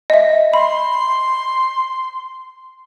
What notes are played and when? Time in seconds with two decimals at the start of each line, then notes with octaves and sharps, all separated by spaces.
0.10 D#5 E5
0.54 B5 C6